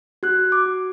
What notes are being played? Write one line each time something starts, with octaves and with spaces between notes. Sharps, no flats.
F#4 F#6
D6
F#4